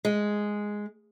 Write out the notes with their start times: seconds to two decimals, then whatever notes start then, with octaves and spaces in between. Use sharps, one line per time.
0.05 G#3